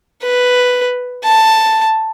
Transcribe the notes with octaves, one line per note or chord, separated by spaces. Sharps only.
B4
A5